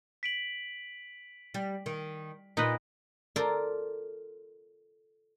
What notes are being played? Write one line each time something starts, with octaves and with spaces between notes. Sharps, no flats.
B6 D7 F#7
G3
D#3
A#2 D#4 B4 D#5
F4 A4 A#4 C5 D5